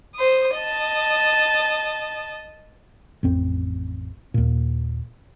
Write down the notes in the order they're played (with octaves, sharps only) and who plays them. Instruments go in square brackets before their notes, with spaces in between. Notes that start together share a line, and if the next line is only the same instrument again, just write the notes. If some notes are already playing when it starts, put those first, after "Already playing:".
[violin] C5 D#6
D#5 A5
[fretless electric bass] A1 F2 C4
D#2 A#2